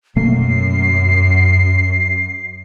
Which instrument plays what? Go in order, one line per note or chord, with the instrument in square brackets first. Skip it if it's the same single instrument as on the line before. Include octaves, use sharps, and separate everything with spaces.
[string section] F#2 [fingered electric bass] B2 A3 A#3 [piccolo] C7